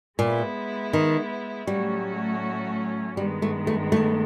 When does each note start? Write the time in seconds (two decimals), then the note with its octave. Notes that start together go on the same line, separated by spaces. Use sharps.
0.19 A#2 G#3 B3 E4
0.93 D#3
1.67 A2 F#3 G3 A3 C#4 F#4
3.17 G2 D#3 G3 G#3 B3
3.42 A3
3.67 A3
3.92 A3